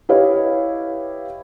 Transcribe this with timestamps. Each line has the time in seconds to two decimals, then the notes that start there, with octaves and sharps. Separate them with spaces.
0.09 E4 G4 B4 C#5 D#5 F5